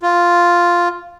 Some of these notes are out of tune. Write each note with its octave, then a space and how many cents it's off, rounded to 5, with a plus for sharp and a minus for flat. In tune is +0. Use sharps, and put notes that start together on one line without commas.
F4 +0